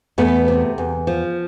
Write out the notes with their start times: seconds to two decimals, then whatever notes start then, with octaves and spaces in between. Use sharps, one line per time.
0.18 E2 A3 B3
0.48 C3
0.78 E2
1.07 F3